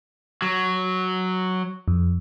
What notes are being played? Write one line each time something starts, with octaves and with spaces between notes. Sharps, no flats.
F#3
F2